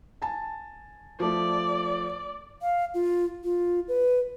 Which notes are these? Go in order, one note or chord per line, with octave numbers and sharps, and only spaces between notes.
G#5 A5
F3 A3 D5
F5
F4
F4
B4